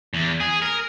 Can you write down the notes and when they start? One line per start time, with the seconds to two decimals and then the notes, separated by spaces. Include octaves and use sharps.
0.14 E2
0.40 G#4
0.62 A#4